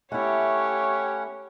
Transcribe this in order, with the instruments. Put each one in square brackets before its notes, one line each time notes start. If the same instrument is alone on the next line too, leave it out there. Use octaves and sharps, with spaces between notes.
[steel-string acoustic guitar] A3 E4 [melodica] C#4 F#5 [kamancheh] G4 C#5